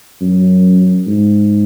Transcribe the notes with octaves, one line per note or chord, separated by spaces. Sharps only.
F#2
G#2